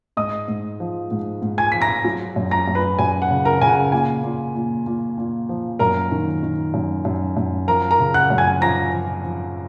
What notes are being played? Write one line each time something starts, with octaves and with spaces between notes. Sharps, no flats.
G#2 D#5 D#6
G#2
F3
G#2
G#2
G#5 G#6
F3 B6
A#5 A#6
F#3
F#2
A#5 A#6
F#2
B4 B5
F#2 G#5
F#5
C#3
A#4 A#5
C#3 G#5
F#5
A#2 G#5
A#2
A#2
A#2
A#2
F3
F#2 A#4 A#5
D#3
D#3
F#2
F#2
F#2
F3 A#4 A#5
A#4 A#5
C#3
F#5 F#6
F#2
G#5 G#6
F3 A#5 A#6
F3
F3